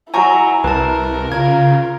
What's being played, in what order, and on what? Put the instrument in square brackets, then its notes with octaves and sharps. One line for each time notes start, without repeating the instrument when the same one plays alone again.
[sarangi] F#3 [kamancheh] E4 [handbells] G#5 A#5 C#6
[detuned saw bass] C2 [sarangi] A#4 [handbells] B4 A5
[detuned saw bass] C#3 [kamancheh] F4 [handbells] G#6